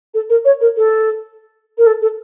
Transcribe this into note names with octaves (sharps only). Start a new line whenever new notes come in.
A4
A#4
C#5
A#4
A4
A#4
A4
A4